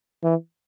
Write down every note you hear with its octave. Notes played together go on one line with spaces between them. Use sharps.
E3